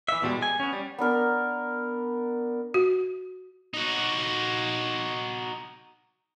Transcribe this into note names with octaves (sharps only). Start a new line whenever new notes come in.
E3 E5
E2 B2 D3 G3 G#3
G#5
B3 C#4
G3
B3 D4 A#4
F#4
D#4 F#4